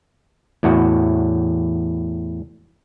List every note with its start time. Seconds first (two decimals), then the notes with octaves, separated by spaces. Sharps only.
0.63 E2 A2 F#4